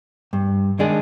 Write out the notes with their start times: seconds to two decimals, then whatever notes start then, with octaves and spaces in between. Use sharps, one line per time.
0.33 G2
0.79 D#3 G#3 D4 G#4